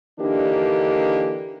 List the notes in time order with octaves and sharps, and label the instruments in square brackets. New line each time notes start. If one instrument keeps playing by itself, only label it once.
[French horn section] D3 E3 A#3 D4 D#4 G4